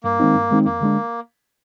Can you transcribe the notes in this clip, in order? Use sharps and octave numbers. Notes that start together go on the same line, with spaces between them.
G2 A#3
D#3 G#3 C4 D#4
G2
D#3 G#3 C4 D#4
F2 A#3
D3 G#3 D4